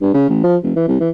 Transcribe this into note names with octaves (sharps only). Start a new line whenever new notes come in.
G2
C#3
A1
F3
F1
E3
C2
E3